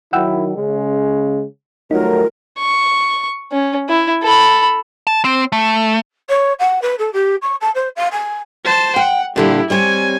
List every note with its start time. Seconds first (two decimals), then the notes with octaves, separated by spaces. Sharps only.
0.13 D#3 F#3 E4 F#5 G5 E6
0.56 C#3 G#3
1.91 D#3 F#3 G3 A3 D#4 F4 A#4
2.59 C#6
3.52 C#4
3.89 E4
4.23 A4 B5
5.07 A5
5.24 C4
5.52 A3
6.29 C#5
6.59 F#5
6.81 B4
6.98 A4
7.12 G4
7.42 C#6
7.60 A5
7.74 C5
7.96 F5
8.11 G#5
8.64 C5 A5
8.96 F#5 G5
9.36 A#2 D3 G3 E4 G4
9.70 G3 C4 C#5 G#5